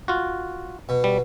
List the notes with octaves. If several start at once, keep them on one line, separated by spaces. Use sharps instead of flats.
F4 F#4
B2
G3